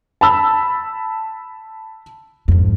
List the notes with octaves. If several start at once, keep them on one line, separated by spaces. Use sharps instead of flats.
A5 B5 E6
F2 G#2